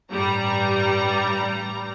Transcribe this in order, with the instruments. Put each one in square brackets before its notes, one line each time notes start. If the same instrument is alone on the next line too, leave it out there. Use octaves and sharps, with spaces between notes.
[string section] A1 G2 G3 A#5